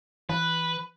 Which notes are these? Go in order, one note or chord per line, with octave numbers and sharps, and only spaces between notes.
E3 B4